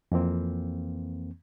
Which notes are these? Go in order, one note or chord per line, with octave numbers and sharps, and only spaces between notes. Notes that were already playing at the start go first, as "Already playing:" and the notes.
F2 E3 A#3 C4